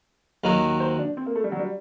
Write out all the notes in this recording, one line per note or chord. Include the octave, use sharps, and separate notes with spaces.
D#2 D#3 F#3
C5
D4
C4
A#3
A3
G3
F#3
G3